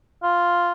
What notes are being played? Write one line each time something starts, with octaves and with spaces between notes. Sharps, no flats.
F4